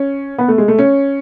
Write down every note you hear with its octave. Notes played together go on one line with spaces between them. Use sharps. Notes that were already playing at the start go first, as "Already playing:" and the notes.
Already playing: C#4
B3
A3
G#3
A3
C#4